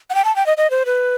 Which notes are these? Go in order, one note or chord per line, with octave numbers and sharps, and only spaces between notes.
F#5
G5
A5
G5
D#5
D#5
C5
B4